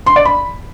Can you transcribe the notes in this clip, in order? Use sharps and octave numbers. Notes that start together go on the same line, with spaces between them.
C6
D5
B5